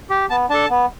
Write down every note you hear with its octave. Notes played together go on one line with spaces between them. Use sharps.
G4
B3 A5
D4 A4 A5
B3